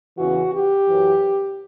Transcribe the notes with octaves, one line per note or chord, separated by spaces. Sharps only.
E2 C#3 E3 F#4
G4
F#2 E3